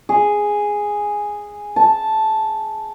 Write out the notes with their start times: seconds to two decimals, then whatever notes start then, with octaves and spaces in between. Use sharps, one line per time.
0.09 G#4
1.76 A5